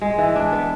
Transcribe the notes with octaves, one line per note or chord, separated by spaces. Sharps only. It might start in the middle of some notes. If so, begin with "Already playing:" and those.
G#3
E3
D4
B3